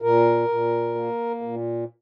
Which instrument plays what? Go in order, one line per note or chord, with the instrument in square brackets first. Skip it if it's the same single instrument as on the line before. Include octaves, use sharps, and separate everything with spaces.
[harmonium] A#2 A#4
A#2
A#3
A#2